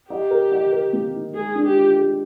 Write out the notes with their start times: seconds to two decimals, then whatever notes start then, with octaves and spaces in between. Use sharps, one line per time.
0.10 G4 D#5
0.31 A#4
0.52 D#5
0.72 A#4
0.93 A#3
1.14 D#4
1.34 G#3 G#4
1.55 D4
1.65 G4
1.75 F4
1.96 G#3